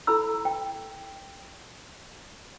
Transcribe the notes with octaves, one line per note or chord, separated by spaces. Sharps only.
E4 A4 A#5 B5 E6
G5